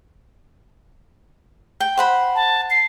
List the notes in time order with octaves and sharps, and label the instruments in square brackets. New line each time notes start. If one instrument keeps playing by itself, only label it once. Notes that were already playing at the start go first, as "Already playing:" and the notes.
[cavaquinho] G5
C5 F#5 B5
[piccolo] A5
C7